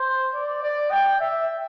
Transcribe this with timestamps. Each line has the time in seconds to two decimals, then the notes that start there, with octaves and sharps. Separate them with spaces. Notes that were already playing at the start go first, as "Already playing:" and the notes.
Already playing: C5
0.34 D5
0.63 D5
0.91 G5
1.20 E5